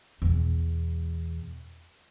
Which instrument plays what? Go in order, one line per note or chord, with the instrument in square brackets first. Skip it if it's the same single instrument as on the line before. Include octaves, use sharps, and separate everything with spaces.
[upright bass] E2 B2